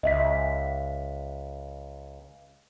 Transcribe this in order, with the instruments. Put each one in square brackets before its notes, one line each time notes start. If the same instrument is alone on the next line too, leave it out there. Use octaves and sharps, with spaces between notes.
[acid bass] C#2 [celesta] D#5 E5 B6